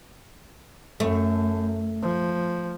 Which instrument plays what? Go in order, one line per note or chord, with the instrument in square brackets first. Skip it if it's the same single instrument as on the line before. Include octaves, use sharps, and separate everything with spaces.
[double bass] F#2 [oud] A3
[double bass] F3